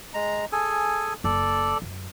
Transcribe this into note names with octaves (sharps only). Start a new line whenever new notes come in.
G#3 A#5
G#4 A4 G#5
F#1 A4 D5
F#2